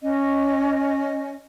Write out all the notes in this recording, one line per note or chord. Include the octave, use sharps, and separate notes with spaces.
C#4 D#5